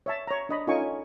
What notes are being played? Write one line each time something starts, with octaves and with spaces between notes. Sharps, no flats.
C#5 E5 A5
C#5 A#5
D4 D#5 B5
C#4 D#4 F4 A4 G#5 C#6